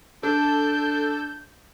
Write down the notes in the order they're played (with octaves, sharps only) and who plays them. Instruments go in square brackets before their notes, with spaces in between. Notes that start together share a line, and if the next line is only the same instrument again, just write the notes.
[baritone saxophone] D4 [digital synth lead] A4 [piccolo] G6